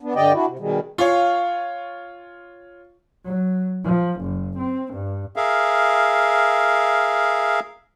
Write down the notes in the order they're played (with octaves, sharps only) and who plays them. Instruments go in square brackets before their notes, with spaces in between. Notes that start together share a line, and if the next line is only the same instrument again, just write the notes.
[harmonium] B3 D4
G2 D3 G4 D5 D#5 G5
D4 E4 F#4
C3
B2 D#3 G3 G#3
[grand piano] F4 C#5 [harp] F5 G#5 C#6
[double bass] F#3
F3
F#1
C4
G2
[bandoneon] G#4 A#4 E5 F5